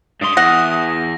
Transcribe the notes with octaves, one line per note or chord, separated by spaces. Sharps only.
G2 C6 D#6
E2 F#5 A#6